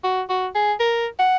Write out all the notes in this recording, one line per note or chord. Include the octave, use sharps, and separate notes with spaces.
F#4
F#4
G#4
A#4
F#5